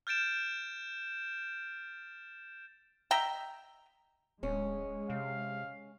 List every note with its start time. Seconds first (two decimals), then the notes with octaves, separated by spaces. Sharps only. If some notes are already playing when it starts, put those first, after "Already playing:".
0.07 F6 G6 A6 D7 E7
3.11 D#5 E5 G5 A#5
4.43 D1 G#3 C#4
5.10 C3 F5